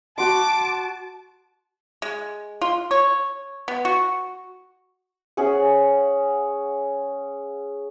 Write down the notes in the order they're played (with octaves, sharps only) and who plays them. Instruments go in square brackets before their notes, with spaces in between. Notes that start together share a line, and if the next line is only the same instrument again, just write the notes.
[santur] F#4 C6 [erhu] A5 [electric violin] D6
[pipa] G#3
F4
C#5
B3
F#4
[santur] C#4 G#4 E5 F#5